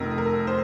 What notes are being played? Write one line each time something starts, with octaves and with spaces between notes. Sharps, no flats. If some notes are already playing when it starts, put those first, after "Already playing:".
Already playing: F1 F2 D#3 A#4
A#4
C5